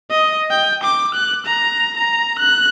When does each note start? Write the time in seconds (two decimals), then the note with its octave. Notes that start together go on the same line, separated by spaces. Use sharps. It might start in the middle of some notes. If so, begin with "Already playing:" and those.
0.11 D#5
0.50 G5
0.83 D6
1.14 F#6
1.46 A#5
1.97 A#5
2.39 F#6